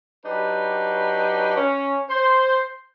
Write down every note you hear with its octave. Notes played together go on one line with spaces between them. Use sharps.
F#3 D4 D#4 G4 B4
C#4
C5